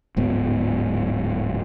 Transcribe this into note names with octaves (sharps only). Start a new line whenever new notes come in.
D1 G#2 B3